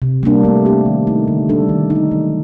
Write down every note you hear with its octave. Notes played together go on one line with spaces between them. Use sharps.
C3
G3 A#3 D4
A3
C4 G4
D#3
A3 D#4
D3
G3 D4 A4
D#3
D#4
A3
F#3